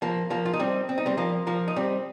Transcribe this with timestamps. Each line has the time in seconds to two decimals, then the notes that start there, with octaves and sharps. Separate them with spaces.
0.02 F3 A#3
0.30 F3 A#3
0.45 F4
0.53 D#4
0.59 G3 C4
0.89 C4
0.98 D#4
1.06 G3 C4
1.17 F3 A#3
1.47 F3 A#3
1.68 D#4
1.76 G3 C4